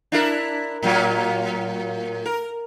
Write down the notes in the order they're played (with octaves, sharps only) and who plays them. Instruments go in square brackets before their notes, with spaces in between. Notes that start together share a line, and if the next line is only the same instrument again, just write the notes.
[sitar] D4 E4 A#4
A2 F#3 A#3
A#4